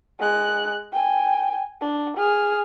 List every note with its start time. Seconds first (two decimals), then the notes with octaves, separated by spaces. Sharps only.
0.20 G#3 F#6
0.92 G5 G#5
1.81 D4
2.17 G#4 F6